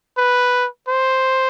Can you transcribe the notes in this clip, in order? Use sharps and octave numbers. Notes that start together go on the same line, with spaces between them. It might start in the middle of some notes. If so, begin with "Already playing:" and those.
B4
C5